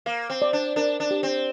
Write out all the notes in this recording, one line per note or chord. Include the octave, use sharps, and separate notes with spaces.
A#3 F5
C4
D5
D4
D4 A#4
D4
G4
C4